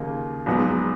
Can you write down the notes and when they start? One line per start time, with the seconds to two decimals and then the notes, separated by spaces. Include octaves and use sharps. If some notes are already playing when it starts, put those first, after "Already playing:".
Already playing: D#2 C#3 F3 A#3 F4
0.46 A#1 G#2 F#3 B3